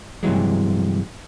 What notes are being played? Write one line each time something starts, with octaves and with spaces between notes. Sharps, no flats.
G2 C3 E3 F#3 G#3